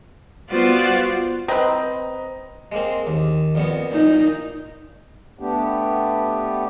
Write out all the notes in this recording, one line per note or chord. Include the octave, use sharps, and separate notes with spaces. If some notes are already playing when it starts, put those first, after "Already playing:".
G3 B3 F4 F#4 C5 D5
C4 B4 D#5 A#5
G#3 A#3 C4
D#2
F2 A#2 B3
A#2 D#4
A3 B3 D4 G4